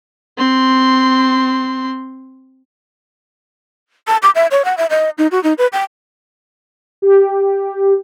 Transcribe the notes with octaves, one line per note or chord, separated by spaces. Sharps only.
C4 C6
A5
D6
E5
C#5
F#5
E5
D#5
D#4
F#4
D#4
B4
G5
G4